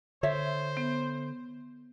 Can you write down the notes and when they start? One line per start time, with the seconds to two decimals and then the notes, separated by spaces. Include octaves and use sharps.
0.23 D3 C5 C#5 E5
0.77 B3